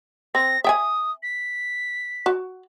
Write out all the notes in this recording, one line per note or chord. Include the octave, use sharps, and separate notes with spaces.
C4 A#6
E5 G5 G#5 D#6
B6
F#4